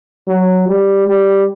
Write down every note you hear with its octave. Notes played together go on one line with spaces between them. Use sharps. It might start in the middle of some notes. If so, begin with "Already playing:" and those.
F#3
G3
G3